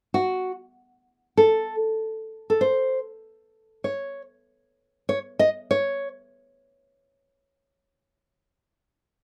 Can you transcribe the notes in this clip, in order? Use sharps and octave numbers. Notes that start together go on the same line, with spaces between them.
F#4
A4
A4
C5
C#5
C#5
D#5
C#5